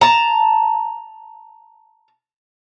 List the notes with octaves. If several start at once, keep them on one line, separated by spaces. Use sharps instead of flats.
A5 A#5